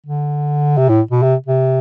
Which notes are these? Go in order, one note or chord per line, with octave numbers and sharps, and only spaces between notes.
D3
C3
A2
B2
C3
C3